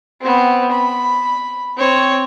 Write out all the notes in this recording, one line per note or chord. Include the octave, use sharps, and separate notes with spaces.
B3 C4
B5
C4 C#5